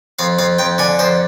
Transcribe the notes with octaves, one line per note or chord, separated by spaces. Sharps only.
F2 F5
F2 F5
F2 G5
D3 G#5
F2 C5